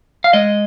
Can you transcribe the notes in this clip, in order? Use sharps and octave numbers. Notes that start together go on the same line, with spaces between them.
F5
G#3 D#5